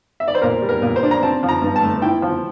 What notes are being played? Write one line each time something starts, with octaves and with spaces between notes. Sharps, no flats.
E5
D5
C5
A#2 A#4
G3
A#4
A#2
C5
D4
A#5
C4 A5
F3
A#5
G2
A5
A3
E4 G5
F3